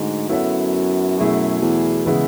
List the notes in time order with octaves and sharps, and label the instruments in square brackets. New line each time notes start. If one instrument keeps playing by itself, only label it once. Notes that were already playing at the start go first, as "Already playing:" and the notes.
Already playing: [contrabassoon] G#2 [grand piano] D3 A3 D4 F#4
[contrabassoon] F#2 [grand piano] B3 E4 A4 C#5 E5
[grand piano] B2 F#3 A3 E4 G#4
[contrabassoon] E2
[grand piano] C#3 E3 G#3 B3 E4